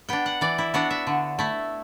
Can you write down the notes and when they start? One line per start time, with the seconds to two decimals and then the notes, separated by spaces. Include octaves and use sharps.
0.09 B3 D4 G5
0.26 F#5
0.41 E3 D5
0.58 E4
0.74 B3 D4 F#4
0.91 E5
1.07 D3
1.39 A3 E4